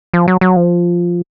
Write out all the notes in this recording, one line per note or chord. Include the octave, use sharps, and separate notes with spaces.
F3
F#3
F#3
F3